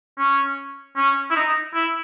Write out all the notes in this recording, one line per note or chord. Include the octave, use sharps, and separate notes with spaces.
C#4
C#4
E4
D#4
E4